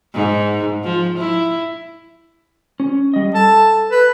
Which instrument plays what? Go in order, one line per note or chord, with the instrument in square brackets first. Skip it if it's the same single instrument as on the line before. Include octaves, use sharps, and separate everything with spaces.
[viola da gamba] G#2
F3
E4
[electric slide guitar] C#4
G3 D#5
[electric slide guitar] A4 [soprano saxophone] A5
[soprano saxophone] B4